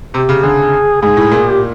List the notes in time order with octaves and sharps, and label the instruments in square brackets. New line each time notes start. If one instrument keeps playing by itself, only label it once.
[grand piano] C3 [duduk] G4
[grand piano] C#3
[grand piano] D3 [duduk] G#4
[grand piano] G#2 [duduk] G#4
[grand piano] A2
A#2
[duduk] G4